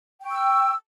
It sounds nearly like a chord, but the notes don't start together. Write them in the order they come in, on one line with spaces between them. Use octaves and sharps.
G5 C#6 E6